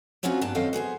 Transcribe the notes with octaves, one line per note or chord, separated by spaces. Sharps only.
A3 C4 C#4 D#4 F4 F#4
G2 A#2 B3 D4 A5
F#2 D#3 C4 A4 D#5 F5
B3 G#4 A4 C5